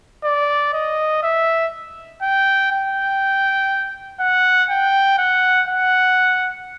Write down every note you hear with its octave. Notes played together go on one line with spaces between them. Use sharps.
D5
D#5
E5
G5
G5
F#5
G5
F#5
F#5